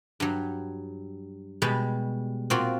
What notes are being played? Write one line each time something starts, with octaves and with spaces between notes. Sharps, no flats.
G2 F#3
B2 G3 G#3 B4
A#2 C4 F4 F#4